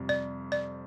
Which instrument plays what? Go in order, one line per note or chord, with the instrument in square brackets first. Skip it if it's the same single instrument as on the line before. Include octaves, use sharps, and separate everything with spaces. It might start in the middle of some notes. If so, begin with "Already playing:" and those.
Already playing: [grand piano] F2 C3 G3
[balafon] D5
D5